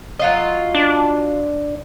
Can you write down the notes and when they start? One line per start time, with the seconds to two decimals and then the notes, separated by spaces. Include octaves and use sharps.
0.19 F#3 F4 D#5
0.75 D4